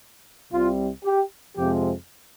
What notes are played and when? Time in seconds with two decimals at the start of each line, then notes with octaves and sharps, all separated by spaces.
0.52 C2 C3 G3 F4
1.04 G4
1.56 F2 C3 F3 G#3 G4